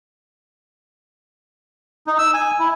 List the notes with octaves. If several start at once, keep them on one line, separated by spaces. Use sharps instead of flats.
D#4
E6
G#5
E4